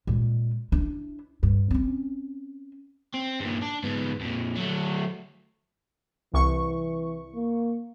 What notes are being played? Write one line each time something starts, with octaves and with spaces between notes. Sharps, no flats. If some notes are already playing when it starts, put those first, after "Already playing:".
A#2 G#3
D4 E4
G2
C4 C#4
C4
G2 A#2
D4
G#2 B3
F2 A#2
F#3 A3
C2 E3 C#6
A#3